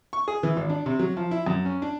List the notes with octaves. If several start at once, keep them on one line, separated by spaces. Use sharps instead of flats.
C#6
G#4
E3
G#1
D4
C3
F#3
F3
E4
F#2
C#4
D4